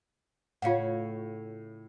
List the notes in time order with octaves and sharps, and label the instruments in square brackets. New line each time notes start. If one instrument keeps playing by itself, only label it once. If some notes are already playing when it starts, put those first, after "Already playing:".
[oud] A2 C#3 C#5 [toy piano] F4 F5 F#5